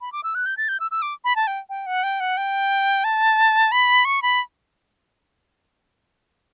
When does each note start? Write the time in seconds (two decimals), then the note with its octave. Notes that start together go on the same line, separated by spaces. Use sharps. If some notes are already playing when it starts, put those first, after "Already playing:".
0.01 B5
0.12 D6
0.23 E6
0.35 F#6
0.46 G6
0.57 A6
0.69 G6
0.80 E6
0.91 E6
1.02 D6
1.24 B5
1.36 A5
1.47 G5
1.69 G5
1.86 F#5
2.03 G5
2.20 F#5
2.37 G5
3.04 A5
3.72 B5
4.05 C#6
4.22 B5